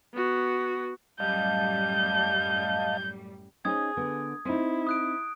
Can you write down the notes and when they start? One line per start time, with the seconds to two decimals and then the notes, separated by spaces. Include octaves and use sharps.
0.14 B3 F#4
1.20 F#2 A2 G3 D#5 F5 A5 G6
3.65 C#4 D#4 G#4 C5 D#6 G#6
3.97 D3 B3
4.45 C4 D#4 E4
4.87 D#6 F#6 D7